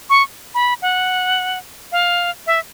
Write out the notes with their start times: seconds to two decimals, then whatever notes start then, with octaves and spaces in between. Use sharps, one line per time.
0.10 C#6
0.55 B5
0.82 F#5
1.92 F5
2.47 E5